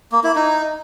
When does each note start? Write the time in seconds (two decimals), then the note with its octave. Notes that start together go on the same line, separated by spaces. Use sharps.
0.12 A#3
0.24 E4
0.36 D#4